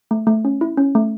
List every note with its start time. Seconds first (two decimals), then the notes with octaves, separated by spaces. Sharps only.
0.11 A3
0.27 A3
0.45 C#4
0.61 E4
0.77 C#4
0.95 A3